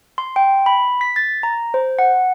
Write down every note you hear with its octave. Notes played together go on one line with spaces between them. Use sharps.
C6
G5
B5
B6
A6
A#5
C5
F#5